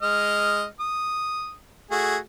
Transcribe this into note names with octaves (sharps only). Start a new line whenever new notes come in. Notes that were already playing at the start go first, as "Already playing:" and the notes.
G#3 D#5 F6
D#6
A3 F#4 G#4